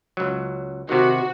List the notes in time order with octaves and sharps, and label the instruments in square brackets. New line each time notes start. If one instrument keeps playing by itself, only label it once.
[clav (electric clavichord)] C#2 F#3
[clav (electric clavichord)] C3 D#3 [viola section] F#4